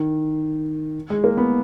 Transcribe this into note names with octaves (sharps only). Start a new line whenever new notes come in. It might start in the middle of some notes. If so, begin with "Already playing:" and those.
Already playing: D#3
G#3
A#3
B3